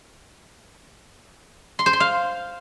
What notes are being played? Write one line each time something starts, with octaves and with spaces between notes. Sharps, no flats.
C6
C5
C6
F5